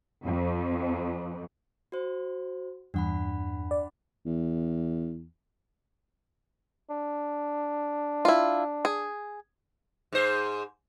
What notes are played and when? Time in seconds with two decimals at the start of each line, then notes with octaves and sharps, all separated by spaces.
0.24 F2
1.92 F#4 C5
2.94 E2 G2 D4 F#5 B5
3.71 D5
4.25 E2
6.90 D4
8.25 E4 F4
8.85 G#4
10.12 G#2 C5